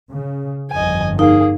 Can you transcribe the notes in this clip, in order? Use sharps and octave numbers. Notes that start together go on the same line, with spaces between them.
C#3
G1 F2 D#5 G#5
A#3 D#4 G#4